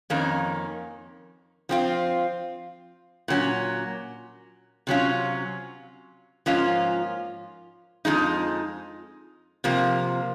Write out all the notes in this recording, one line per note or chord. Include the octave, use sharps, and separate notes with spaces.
F2 D#3 A#3 C#4
F3 C4 F4
A#2 F#3 C#4
C3 F#3 C#4 F4
G#2 F3 A#3 C#4 F4
F2 C3 F3 G#3 D#4
C3 F3 A#3